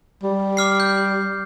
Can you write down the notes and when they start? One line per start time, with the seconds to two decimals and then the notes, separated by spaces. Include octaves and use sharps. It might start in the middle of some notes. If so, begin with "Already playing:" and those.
0.23 G3
0.57 D6 F6 C7
0.80 G6